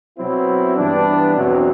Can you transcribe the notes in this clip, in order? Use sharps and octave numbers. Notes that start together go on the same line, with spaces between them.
B2 F#3 C4 E4
G2 E3 B3 D4
E2 B2 F#3 C4